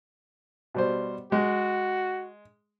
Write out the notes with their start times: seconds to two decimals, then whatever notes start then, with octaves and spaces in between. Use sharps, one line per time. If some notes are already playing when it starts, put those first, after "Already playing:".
0.75 B2 G3 C5
1.32 G#3 F#4